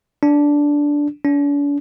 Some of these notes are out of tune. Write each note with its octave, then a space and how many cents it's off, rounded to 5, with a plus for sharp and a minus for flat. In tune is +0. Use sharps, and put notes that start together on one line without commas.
D4 -10
D4 -45